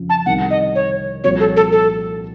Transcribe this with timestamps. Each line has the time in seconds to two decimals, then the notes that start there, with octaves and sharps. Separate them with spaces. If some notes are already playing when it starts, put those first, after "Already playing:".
Already playing: F2 C#3 F3
0.10 A5
0.26 C2 C3 D#3 F#5
0.50 D#5
0.75 C#5
1.24 C2 A#2 F3 C4 F#4 C#5
1.40 A4
1.57 A4
1.72 A4